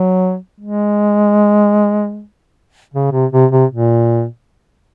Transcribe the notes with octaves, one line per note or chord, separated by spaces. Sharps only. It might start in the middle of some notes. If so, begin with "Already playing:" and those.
Already playing: F#3
G#3
C#3
C3
C3
C3
A#2